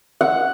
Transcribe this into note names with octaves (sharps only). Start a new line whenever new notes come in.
F#5